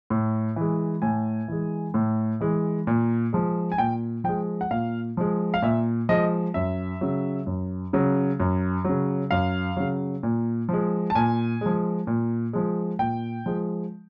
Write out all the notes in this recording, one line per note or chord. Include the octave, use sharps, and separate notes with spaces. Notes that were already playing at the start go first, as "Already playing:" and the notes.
A2
E3 G#3
A2 G#5
E3 G#3
A2
E3 G#3
A#2
F3 G#3
G#5
A#2 G5
F3 G#3 G5
F#5
A#2 F5
F3 G#3
F5
A#2 E5
F3 G#3 D#5
F#2 E5
C#3 F#3
F#2
C#3 F#3
F#2
C#3 F#3
F#2 F5
C#3 F#3
A#2
F3 G#3
A5
A#2 G#5
F3 G#3
A#2
F3 G#3
A#2 G5
F3 G#3